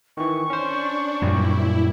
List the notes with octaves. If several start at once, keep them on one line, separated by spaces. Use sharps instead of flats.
D#3 E3 C#6
C#4 D4 C5
F#2 A#2 G3 E4